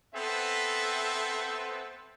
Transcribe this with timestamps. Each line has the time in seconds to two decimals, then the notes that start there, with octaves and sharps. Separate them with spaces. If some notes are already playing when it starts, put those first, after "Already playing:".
0.15 B3 C4 A4 C5 E5